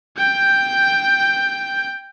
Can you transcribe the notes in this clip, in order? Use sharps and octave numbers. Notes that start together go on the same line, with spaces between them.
G5 G6